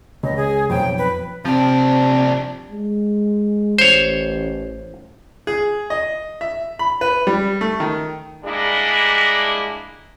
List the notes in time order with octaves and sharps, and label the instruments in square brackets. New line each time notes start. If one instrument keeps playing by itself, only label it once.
[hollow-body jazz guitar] C#2 [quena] D#5
[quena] G#4
[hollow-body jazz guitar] B1 F2 [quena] G5
[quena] B4
[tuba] C3 [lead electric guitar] F3 D4 [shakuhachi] C4
[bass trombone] G#3
[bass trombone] A1 [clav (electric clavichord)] C5 C#5
[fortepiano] G#4
D#5
E5
B5
B4
G3
A3
D#3
[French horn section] G3 G#3 A#3 D4 E4